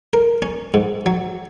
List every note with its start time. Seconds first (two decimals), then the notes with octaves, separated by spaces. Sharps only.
0.13 A#4
0.42 C#4
0.74 G#2
1.06 F#3